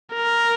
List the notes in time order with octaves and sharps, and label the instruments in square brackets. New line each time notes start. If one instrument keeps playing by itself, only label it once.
[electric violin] A#4